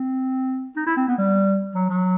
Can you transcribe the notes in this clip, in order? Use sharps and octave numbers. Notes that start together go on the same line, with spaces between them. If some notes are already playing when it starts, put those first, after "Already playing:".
Already playing: C4
D#4
E4
C4
B3
G3
F#3
F#3